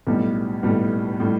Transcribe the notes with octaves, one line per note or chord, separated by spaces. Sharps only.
B1 A2 G3
B1 A2 G3
A2 G3